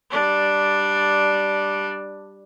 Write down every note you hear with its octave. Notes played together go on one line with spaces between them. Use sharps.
G3 D4